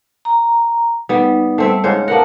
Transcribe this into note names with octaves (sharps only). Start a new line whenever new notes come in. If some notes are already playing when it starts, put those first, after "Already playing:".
A#5
G3 B3 D#4
G3 A3 C4 E5
G#2 C#3 C5 C#5
A#3 B3 A#4 F#5 A5